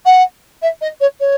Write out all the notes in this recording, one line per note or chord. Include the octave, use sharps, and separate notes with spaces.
F#5
E5
D#5
C#5
C#5